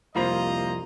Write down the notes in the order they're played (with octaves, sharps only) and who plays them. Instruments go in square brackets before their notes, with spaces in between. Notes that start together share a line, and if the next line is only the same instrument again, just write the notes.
[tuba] C2 [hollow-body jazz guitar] F2 F4 B5 [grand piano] A#3 C5 [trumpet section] D#5 A#5